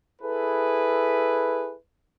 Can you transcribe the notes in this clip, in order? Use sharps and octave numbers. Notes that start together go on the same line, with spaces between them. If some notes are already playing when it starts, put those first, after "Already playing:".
E4 G#4 A4 B4